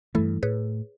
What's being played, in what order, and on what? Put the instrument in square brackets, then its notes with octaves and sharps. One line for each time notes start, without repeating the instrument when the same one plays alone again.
[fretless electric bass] G2 E3 [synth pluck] A3 E4 A4
[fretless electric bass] A2 [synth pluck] G#4 B4 C#5